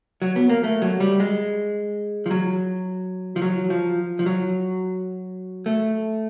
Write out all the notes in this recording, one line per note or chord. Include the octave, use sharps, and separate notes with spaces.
F#3
B3
A#3
A3
F#3
G3
G#3
F3
F#3
F3
F#3
F3
F3
F#3
A3